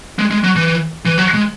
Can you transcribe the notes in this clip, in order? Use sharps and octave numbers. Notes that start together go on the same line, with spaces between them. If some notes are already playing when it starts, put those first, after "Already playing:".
G#3
G#3
F#3
E3
E3
F#3
G#3